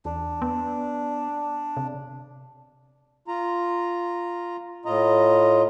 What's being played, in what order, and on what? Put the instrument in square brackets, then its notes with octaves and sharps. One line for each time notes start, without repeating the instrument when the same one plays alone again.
[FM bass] E2 [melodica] D4
[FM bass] B3
C3
[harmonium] F4 A#5
A2 F4 D#5 A#5